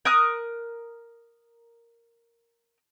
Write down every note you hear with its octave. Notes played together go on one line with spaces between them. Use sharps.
A#4 D#6 F#6